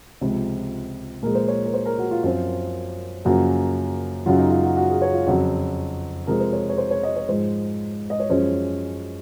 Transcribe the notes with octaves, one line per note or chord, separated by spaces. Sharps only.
C#2 C3 F3
A#2 F3 G#3 A#4
C5
C#5
A#4
C5
A#4
F#4
F4
F#2 F3 C4 F4
F#2 C#3 F3 A#3 F#4
F#2 C#3 F#3 F4
D#4
F4
F#4
F#4
G#4
C#5
F4
F2 C#3 F#3 F#4
C3 F3 G#3 A#4
C5
C#5
C#5
C5
C#5
D#5
C#5
G#2 F3 G#3 C5
D#5
C#5
F#2 F3 G#3 C#4 C5